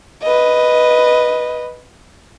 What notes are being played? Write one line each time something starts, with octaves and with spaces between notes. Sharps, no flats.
B4 D#5